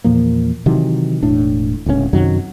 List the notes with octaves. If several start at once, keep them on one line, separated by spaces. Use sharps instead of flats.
E2 A#2 F3 A#3
C3 D#3 E3 F#3
E1 A2 D4
D1 C#2 C#3 C#4
F#2 C3 D#3 F#3